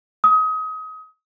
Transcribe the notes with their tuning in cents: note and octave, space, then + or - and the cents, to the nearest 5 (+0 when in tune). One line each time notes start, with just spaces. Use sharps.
D#6 +30